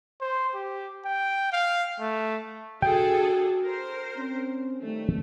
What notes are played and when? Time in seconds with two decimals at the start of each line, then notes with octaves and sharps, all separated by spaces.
0.21 C5
0.55 G4
1.05 G5
1.53 F5
2.00 A3
2.82 D4 F#4 G#4 A4 G5
3.62 A#4 C5
4.16 C4 C#4
4.82 D#3 G3 A3 C#4